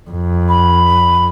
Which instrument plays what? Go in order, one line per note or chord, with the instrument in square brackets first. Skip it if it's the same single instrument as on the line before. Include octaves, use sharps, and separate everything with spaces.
[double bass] F2
[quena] B5